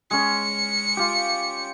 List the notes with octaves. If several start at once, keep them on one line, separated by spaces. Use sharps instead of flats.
G#3 C#4 C#7
F4 G4